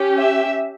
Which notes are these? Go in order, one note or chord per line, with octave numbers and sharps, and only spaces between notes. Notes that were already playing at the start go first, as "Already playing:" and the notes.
Already playing: C#4 G4
E5